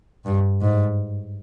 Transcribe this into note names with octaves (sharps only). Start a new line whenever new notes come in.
G2
G#2